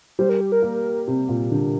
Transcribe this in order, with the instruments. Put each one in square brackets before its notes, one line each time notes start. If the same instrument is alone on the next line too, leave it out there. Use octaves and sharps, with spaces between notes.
[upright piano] G3 [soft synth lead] C5
[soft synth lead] A#4
G4
A#4
[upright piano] A#3
C3
A#2
D3